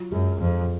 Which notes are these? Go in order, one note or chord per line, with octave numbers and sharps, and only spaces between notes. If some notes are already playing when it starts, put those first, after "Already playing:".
Already playing: F#3 F4
F#2 G#3
F2 F3